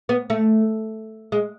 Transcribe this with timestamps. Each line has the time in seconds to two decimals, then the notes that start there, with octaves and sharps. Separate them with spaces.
0.09 B3
0.30 A3
1.32 G#3